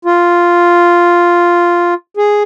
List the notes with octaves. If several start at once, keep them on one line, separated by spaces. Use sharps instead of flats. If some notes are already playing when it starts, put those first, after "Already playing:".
F4
G#4